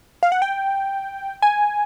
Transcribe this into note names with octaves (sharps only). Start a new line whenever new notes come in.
F5
F#5
G5
G#5